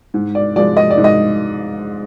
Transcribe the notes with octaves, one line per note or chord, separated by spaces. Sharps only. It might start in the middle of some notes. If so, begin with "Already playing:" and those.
G#2
D5
F3 G#3 D5
D#5
D5
G#2
D#5